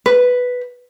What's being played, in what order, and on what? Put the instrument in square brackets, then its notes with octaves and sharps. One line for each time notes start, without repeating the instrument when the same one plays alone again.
[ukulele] B4